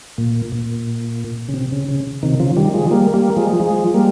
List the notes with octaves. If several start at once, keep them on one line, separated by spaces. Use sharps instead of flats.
A#2
A#2
C#3
C3
C#3
C#3
C3 D#3
C#3 F3
D#3 G3
F3 G#3
G3 A#3
G3 A#3
F3 G#3
F3 G#3
G3 A#3